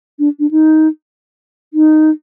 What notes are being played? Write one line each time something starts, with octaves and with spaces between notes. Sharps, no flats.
D4
D4
D#4
D#4